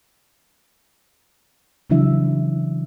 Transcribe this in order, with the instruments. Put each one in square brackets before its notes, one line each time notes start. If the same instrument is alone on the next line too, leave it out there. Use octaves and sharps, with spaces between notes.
[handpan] C#3 E3 F#3 D4 E4 E5